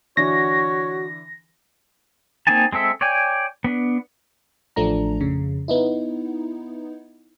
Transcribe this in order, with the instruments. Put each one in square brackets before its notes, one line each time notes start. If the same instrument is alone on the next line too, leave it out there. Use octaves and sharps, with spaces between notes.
[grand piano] D3 E3 D4 [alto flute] F#4 [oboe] C#5 [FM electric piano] A#6
[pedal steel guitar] A#3 C4 D#4 G#5 A5
G#3 C4 A4 E5
C#5 D5 G5 G#5
B3 D4
[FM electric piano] A1 F3 A3 D4 A#5
F2 C#3
B3 D#4 E4